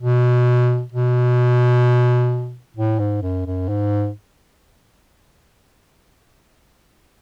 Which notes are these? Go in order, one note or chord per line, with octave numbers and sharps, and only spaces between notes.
B2
B2
A2
G#2
F#2
F#2
G#2